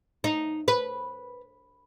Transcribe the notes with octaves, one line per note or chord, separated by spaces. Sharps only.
D#4
B4